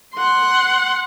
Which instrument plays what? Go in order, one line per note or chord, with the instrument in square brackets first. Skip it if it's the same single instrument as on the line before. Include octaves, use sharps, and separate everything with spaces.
[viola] F#5 C6